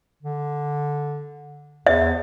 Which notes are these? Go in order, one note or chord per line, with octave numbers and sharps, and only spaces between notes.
D3
E2 E5